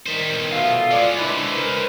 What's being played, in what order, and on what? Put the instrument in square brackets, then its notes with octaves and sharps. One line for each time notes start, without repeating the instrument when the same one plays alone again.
[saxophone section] D#3 [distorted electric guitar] G3 C5
[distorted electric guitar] B1
[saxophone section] B2 A3 B3 [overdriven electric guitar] F4
[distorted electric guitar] G#3 C#4 [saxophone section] D5
[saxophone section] D4 E4 [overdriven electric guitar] B4 C5
[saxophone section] A#4